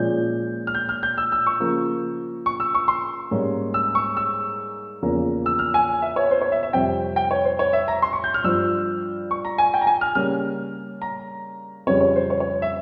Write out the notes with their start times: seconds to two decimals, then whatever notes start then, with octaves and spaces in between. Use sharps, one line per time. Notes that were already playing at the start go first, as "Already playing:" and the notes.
Already playing: A#2 F3 G#3 C#4 G6
0.67 F6
0.75 G6
0.89 F6
1.03 G6
1.18 E6
1.32 E6
1.47 C#6
1.60 C#3 F3 A#3
2.46 C#6
2.60 E6
2.75 C#6
2.88 C6
3.31 G#2 G3 A#3 C#4
3.74 E6
3.95 C#6
4.17 E6
5.02 E2 C#3 F3 A#3 C#4
5.46 E6
5.59 F6
5.74 G#5
6.02 E5
6.16 C#5
6.31 C5
6.42 C#5
6.52 E5
6.63 E5
6.73 F2 C3 G3 C4 G5
7.16 G5
7.31 C#5
7.45 C5
7.59 C#5
7.73 E5
7.88 A#5
8.02 C6
8.13 C#6
8.24 G6
8.34 F6
8.44 G2 F3 C4 E6
9.31 C#6
9.45 A#5
9.58 G#5
9.74 G5
9.81 A#5
9.87 G#5
10.01 F6
10.15 C#3 G3 A#3 C#4 F6
11.02 A#5
11.86 F2 C#3 G3 C#4 C#5
12.01 C#5
12.16 C5
12.30 C#5
12.40 C#5
12.62 E5